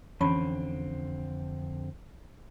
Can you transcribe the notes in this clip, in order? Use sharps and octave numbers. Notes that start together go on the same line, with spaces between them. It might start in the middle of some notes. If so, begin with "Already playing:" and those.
F2 D3 E3 C4 C#4 B5